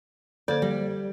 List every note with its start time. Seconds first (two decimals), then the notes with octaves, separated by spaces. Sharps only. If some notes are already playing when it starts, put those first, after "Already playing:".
0.48 D3 A#3 C5 D5
0.62 G3 D5